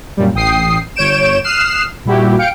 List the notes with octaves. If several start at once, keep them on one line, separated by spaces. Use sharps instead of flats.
F#2 A#2 G3
A1 G5 D#6 C7
G1 C#5 G6 D7 E7
D#6 F6 F#6 C7 E7
A#2 G3 E4 F#4 G4
F5 G5 C#7 D7